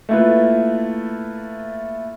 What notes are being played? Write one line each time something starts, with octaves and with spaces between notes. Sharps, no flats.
A3 A#3 E4 F4 B4